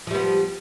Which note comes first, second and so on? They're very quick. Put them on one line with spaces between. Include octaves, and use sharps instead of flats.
F3 G3 B3